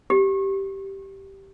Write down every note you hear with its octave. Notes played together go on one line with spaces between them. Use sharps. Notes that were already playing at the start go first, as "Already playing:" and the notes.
G4